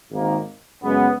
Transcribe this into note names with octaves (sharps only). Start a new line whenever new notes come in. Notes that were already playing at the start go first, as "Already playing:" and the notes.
G#1 G#2 D#3 A#3
F#2 C#3 G#3 B3